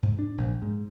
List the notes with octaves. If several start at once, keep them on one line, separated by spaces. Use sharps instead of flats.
G#2
D4
A#1
G#2